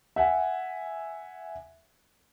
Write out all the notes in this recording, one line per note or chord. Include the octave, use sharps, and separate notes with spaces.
E5 F#5 G#5